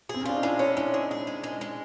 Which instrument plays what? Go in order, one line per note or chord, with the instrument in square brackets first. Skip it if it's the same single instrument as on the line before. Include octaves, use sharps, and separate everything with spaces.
[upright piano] C4 [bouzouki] G#4
[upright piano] C#4
[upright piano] D4 [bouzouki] F4
[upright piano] D#4
[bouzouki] G#3 [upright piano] D4 E4
[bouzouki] C#4
[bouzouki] G#3 [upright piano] D4 E4
[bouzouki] G#4
G#4
G#3
G#3
G#3